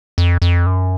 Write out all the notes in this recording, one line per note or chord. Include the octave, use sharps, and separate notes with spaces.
F2
F2
F#2